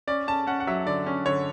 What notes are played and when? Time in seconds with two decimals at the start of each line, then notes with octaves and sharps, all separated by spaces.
0.07 C#4 D5
0.27 C#4 A5
0.47 C#4 F#5
0.60 F#5
0.67 F#3 E5
0.86 D3 D5
1.06 C#4
1.26 D3 C#5